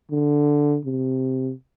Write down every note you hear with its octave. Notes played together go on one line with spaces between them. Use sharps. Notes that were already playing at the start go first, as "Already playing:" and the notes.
D3
C3